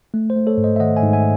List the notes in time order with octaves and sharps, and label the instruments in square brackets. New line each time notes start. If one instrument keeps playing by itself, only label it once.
[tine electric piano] A3
C5
A3
A4 C#5
G#2
C5 D#5
E5
D#3 D#5 F#5
E5 G#5
G#2
E5 G#5